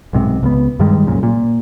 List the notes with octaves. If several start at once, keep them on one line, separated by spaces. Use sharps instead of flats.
B1 G#2 C3
C#2 B3
G2 D#3 G3 G#3
C2 F#2 A#2
A#2